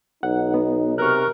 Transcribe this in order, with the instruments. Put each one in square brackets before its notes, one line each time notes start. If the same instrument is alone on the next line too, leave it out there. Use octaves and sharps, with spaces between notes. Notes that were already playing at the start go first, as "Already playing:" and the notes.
[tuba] B1 [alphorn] D#4 [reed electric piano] F#5
[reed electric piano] B3
[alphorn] C3 [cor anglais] A#4 [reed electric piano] C#6 F6 F#6